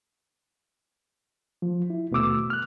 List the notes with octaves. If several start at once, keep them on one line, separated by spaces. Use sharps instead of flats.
F3
E4
D#2 B2 A3 D6 E6
F6 F#6